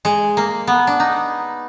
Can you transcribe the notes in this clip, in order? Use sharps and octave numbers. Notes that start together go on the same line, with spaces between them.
G#3
A#3
B3
D4
D#4